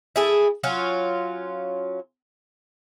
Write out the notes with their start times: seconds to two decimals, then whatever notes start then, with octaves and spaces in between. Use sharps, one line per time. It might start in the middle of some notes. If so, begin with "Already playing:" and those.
0.16 E4 G#4 A4
0.64 F#3 C#4 F4